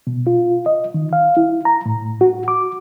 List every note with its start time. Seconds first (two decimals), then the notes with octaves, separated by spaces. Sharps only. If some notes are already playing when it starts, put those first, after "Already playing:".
0.07 B2
0.27 F4
0.66 D#5
0.94 D#3
1.13 F5
1.37 E4
1.65 A#5
1.86 A2
2.21 F#4
2.48 D6